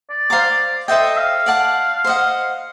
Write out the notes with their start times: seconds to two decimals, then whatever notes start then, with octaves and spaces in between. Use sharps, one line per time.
0.10 D5
0.30 C5 F5 A#5 D6
0.88 A4 C5 D#5 E5 G5
1.17 F5
1.46 D5 F#5 A5
2.04 C5 D#5 F#5